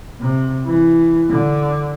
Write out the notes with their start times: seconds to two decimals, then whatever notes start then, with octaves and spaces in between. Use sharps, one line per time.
0.20 C3
0.66 E3
1.29 D3